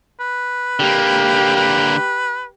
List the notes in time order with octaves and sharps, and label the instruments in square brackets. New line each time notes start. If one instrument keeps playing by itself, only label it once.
[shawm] B4
[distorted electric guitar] D3 A#3 [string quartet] G4
[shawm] B4